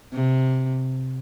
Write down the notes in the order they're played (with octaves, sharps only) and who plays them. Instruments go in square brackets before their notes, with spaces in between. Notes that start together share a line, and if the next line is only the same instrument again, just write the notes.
[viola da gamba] C3